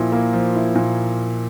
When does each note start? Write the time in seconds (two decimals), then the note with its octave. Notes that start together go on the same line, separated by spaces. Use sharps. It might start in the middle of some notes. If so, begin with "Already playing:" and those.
Already playing: A#2 F3 E4
0.12 A#3
0.33 F3
0.55 E4
0.75 A#2